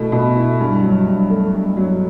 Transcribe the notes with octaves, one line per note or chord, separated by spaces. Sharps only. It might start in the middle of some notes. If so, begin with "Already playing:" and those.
Already playing: B2 A3 E4
B2
E4
G2
F#3
G2
A3
G2
F#3